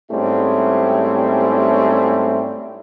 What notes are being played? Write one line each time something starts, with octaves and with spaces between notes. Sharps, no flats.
G#2 G3 A3 C4 C#4 E4